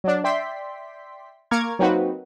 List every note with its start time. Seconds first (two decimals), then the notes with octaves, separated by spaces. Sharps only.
0.04 F#3 D4
0.24 D5 E5 G5 C6 B6
1.51 A#3 A#5 C#6 D6 F6 G#6
1.79 F#3 A#3 C4 D#4 F#4 B4